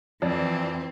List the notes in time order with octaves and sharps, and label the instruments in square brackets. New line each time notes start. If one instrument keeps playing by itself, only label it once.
[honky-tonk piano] F2 D5 [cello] E3 C4